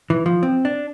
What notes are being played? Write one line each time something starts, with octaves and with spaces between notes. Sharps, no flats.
E3
F3
C4
D4